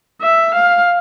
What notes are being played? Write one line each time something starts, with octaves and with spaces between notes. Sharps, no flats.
E5
F5